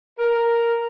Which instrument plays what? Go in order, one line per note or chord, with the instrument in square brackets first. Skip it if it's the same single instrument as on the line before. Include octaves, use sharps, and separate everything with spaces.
[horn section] A#4